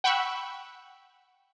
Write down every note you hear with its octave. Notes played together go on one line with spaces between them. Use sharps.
F#5 G5 B5 C#6 E6 F#6